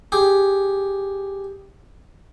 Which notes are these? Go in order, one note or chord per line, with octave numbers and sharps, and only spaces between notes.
G4 G#4